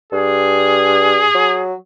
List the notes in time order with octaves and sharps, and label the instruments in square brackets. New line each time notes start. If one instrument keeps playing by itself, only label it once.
[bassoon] G2 [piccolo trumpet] G#4
[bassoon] F#3